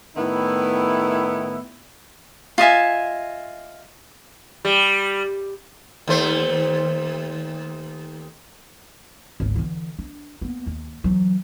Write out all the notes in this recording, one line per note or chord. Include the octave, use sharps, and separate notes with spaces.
A2 D#3 B3 E4
F4 D#5 E5 G#5
G3
D#2 A3 C5
G#1 C#2
D3 E3
D4
A#3 B3
D#2
E3 F#3